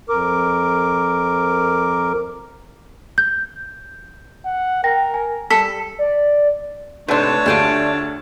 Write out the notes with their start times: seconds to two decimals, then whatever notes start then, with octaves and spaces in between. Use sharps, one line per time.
0.09 F2 A#4 D6
3.18 G6
4.45 F#5
4.84 A#4 G5 A#6
5.14 G#5
5.50 G3 A4 B6
5.99 D5
7.08 G#2 C3 A3 D4 A4 B4 C#5 A5
7.46 D2 D3 F4 G4 G#4